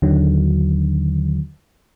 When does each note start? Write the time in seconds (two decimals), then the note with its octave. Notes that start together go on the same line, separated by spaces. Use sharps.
0.02 D#2 D3 D#3 F#3